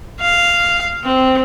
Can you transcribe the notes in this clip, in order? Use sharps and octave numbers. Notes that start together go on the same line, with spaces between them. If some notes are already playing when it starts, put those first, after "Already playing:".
F5
C4